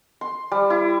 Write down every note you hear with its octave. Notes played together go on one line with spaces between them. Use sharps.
C6
G3
E4